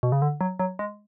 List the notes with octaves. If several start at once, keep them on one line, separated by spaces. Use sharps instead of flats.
B2
C#3
D3
F#3
F#3
G#3